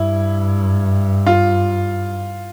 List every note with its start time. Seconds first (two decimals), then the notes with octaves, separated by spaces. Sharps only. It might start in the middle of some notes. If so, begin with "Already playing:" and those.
Already playing: G2 E4
1.26 F4